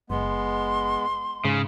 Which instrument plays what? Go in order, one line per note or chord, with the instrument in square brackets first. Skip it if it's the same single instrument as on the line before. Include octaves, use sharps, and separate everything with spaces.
[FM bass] F#1 [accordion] G#3 B3 [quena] C6
[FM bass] G#2 [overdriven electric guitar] C#3